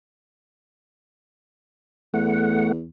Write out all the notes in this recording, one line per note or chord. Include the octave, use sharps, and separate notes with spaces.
E2 A3 F#5